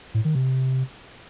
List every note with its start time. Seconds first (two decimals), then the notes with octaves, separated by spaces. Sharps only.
0.14 A2
0.25 D#3
0.35 C3